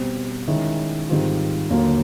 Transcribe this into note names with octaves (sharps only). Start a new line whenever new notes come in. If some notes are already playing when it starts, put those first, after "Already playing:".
Already playing: B2 G3 C4
D#3 G#3 C#4 E4
G#2 D#3 G3 C4 F4
D#2 D3 F#3 A#3